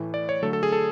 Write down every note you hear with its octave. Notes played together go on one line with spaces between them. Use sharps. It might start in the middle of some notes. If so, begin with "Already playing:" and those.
Already playing: A2 E3 A3
D5
C#5
D3 F#3 A3 A4
A4
G#4
A4